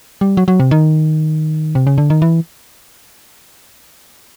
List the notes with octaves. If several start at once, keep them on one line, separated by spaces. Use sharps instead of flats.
G3
F#3
F#3
C3
D#3
C3
C#3
D3
D#3
E3